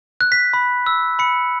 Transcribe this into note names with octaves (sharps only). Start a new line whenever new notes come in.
F#6
B6
B5
E6
B5 C#7